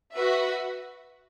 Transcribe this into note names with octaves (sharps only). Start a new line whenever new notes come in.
F#4 B4 E5